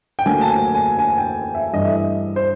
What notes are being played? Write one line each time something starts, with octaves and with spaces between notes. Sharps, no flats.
G5
D2 D3 F#3 A#3 G#5
A5
G#5
G#5
G#5
G5
E5
G2 E3 A3 D#5
E5
D#5
C5